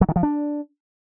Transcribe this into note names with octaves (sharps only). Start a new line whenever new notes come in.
F#3
D#3
F3
D4